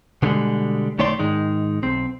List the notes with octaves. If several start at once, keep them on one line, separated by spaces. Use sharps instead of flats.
B2 D3 E3 G3 G#3
B1 D#3 A3 C#5 D5 C6
G#2 D#3 G#3 D#4
B1 C4